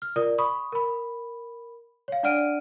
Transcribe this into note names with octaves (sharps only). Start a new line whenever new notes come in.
F6
F4 A#4 D5 D#6
B5 C#6 D#6
A#4 B5
C#5 F5
D4 D5 F#5 F6 D7 D#7